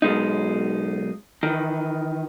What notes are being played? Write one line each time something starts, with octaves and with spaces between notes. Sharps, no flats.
B1 G#3 D#4
D#3 E3